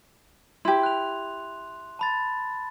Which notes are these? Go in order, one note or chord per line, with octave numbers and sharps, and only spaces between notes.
E4 G4 C6
F#6 F7
A5 B5 A6